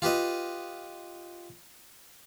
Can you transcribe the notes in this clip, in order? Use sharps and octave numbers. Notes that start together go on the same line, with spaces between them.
F4 G4 B4 D#5